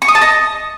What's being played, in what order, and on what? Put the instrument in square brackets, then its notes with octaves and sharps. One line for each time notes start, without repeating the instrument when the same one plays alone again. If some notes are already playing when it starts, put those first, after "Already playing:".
[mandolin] C#6
D#6
A5
D#5